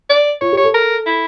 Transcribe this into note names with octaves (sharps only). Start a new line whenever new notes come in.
D5
F4 C#5
G4
C#5
A4
A#4
E4